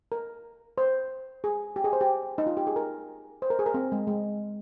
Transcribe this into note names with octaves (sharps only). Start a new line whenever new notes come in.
A#4
C5
G#4
G4
G#4
C5
G4
D#4
F4
G4
G#4
A#4
C5
A#4
G#4
A#4
C4
G#3
G#3